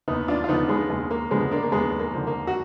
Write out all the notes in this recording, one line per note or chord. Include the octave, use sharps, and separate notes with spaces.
D#2 B3 D#4
D4 F4
F4
D3 F3 B3 D#4
G#3 B3
D#2 G#3
A#3
D3 F3 G#3 B3
A#3 D4
A#3
D#2 G#3 B3
A#3
D3 F3
A#3
F#4